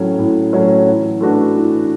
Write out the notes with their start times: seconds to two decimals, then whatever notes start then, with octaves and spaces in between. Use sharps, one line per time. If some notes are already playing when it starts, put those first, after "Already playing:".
Already playing: A2 F#3 A3 C#4
0.18 A2
0.53 F#3 A3 C#4
0.87 E3
1.20 A3 D4 F#4 B4
1.55 E3